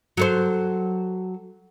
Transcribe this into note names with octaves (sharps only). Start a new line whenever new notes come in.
F#3 A4 C5